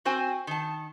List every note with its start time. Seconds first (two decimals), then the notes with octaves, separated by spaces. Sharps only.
0.05 C4 F#4 C5 G5 G#5
0.47 D#3 A5